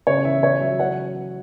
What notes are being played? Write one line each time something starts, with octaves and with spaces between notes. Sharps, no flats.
C#3 C#5
E3 E5
C#3 C#5
F#3 E5
E3 C#5 F#5